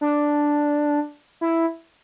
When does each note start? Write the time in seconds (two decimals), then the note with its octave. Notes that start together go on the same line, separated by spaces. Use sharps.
0.01 D4
1.41 E4